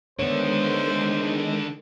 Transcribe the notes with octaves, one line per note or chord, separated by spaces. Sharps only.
D3 D#3 G#3 A3 B3 C5 C#5